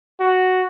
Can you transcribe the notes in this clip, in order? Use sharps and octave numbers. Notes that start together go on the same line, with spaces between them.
F#4